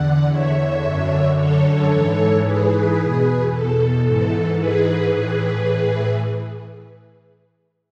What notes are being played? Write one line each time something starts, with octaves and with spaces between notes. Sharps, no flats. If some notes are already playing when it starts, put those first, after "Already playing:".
Already playing: E2 D3 D5 F#5
C#5 E5
F#2 D3
A4 C#5
G#2 E3
G#4 B4
E2 B2
A4
G#2 E3 A4
G#4 B4
A2 E3 G#4 B4